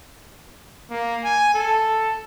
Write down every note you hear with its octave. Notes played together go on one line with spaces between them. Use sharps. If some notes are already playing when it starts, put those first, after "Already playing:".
A#3
G#5
A4